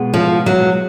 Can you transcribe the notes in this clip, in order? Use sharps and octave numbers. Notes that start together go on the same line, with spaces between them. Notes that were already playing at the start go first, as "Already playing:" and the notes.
Already playing: B2 G#3 B3
F3
F#3